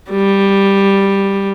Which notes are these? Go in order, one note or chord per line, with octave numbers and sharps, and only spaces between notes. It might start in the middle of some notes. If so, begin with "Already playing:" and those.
G3